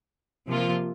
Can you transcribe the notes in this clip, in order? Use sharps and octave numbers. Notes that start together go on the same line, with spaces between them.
C3 F3 A#3 F4